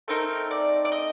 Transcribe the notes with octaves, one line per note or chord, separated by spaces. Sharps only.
A3 C4 D#4 A#4
D5
D5
D#5